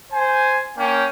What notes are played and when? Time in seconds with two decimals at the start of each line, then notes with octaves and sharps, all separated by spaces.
0.12 C5 G#5
0.77 A#3 C#4 G5